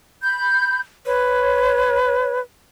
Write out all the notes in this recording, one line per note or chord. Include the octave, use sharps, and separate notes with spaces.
B5 G6
B4 C#5